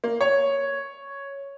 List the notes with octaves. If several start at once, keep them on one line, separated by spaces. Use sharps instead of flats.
A#3
C#5